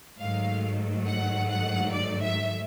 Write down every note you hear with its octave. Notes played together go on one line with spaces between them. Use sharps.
G#2 D#3 F#3 A3 F5
F#5
F#5
D5
E5